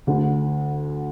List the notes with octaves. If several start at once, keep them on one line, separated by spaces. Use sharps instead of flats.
D2 D3